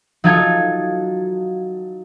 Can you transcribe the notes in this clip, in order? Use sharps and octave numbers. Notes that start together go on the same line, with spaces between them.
F#3 D#4 F4 A4 G#6